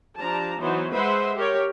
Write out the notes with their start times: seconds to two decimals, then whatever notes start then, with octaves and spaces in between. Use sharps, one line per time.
0.18 F3 D4 G4 A5 A#5
0.59 E3 F#3 B3 D#4 C5 C#5
0.92 G#3 B4 C5 E5 F#5 C6
1.36 G4 A#4 C#5